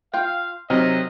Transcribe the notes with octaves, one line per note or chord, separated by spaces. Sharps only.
F4 F5 G5
C3 F#3 C4 D#4 A#4 D#5